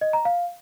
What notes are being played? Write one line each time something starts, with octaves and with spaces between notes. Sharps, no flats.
D#5
A#5
F5